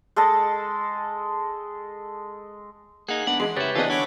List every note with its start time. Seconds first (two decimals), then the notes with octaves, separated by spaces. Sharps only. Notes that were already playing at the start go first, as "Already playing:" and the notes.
0.16 G#3 A4 D#5 A5
3.08 A#3 D#4 G#4 F#5
3.27 G#2 B3 D4 F#5
3.40 E2 G#3
3.56 C#3 E4 G4 B4 C#5 A6
3.75 C3 E3 B3 D4 F4 D#5
3.90 D3 D4 C#5 F#5 B5 D6